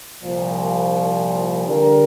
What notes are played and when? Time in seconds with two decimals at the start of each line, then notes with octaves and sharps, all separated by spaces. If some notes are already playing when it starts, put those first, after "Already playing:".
0.21 C2 A#2 F3
1.67 D3 G3 D4 G4 A#4